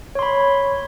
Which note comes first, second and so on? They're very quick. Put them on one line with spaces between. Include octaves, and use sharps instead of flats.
C#5 C6 B5